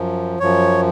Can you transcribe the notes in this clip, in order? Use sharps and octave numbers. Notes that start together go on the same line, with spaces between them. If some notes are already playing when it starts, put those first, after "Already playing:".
Already playing: F#2 F3
F#2 F3 C#5